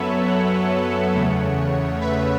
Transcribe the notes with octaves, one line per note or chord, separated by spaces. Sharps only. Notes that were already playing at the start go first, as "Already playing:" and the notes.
Already playing: F#2 F#3 B3 A4 B4 C#5 E5
C#5 F#5
E2 C#3 A3
B4 E5